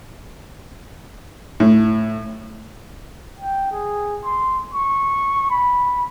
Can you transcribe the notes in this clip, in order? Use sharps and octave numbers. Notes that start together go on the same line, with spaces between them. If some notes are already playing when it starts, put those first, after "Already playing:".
A2
G5
G#4
C6
C#6
B5